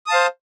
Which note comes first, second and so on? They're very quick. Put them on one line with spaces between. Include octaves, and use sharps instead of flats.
D#6 A5 F5 C5